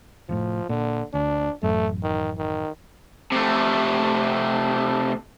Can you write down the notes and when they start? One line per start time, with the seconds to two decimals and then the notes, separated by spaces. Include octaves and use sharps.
0.29 F1 F2 A2 F3
0.69 A#2 D3
1.14 D2 D4
1.63 A1 F#2 A3
2.03 D#3
2.38 D#3
3.32 C3 A3